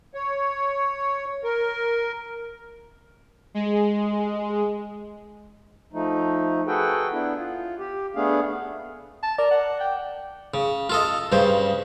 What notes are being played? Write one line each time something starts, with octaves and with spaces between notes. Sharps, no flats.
C#5
A#4
G#3
F3 A3 D#4
F#4 G#4 A4 B4 G5
B3 D4 E4
F4
G4
A3 B3 D4 G#4 F5
A5
A#4 D5
F#5
G5
C#3
F4 A4 D#5
G2 C#3 C5